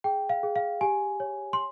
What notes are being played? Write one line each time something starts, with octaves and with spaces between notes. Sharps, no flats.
G#4 G5
F5
G#4
F5
G4 G#5
C#5
C6